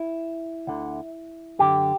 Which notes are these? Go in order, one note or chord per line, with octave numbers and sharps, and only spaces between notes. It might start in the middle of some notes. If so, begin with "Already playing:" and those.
Already playing: E4
D2 D3
F#2 D3 G4